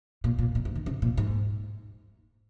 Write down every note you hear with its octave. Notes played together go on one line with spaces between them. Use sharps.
A#2
A#2
A#2
G#2
D#3
C#3
A#2
G#2